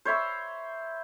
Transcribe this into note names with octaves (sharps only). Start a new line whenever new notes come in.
C5 C#5 E5 B5